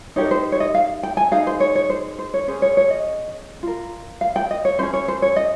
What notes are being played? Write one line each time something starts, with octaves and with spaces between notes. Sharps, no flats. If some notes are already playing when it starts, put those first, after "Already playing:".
D#4 G4 A#4 C#5
C5
C#5
D#5
F5
G5
G#5
D#4 G#4 F5
C5
C#5
C#5
C5
C5
C#5
C#4 G#4 C5
C#5
C#5
D#5
F4 A#4
F5
G5
D#5
C#5
C#4 G#4 C5
C#5
C5
C#5
D#5